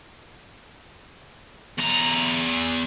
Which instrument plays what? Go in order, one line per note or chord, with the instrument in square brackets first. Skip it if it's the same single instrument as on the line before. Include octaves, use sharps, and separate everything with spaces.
[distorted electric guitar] E2 A#5